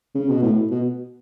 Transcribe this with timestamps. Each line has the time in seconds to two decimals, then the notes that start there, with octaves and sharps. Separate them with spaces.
0.15 C#3
0.29 B2
0.42 A2
0.71 B2